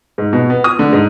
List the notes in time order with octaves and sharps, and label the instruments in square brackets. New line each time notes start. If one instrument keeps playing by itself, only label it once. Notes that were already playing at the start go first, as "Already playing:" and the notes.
[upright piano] G#2
B2
B3
D#6
D3
G#2